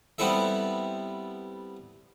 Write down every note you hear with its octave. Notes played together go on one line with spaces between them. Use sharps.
G3 B3 C4 E4 A4 E5